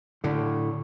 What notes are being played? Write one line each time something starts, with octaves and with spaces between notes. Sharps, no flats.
A2 D3